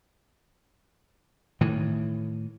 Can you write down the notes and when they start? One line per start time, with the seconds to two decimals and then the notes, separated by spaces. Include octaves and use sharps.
1.61 A2 D#3 E3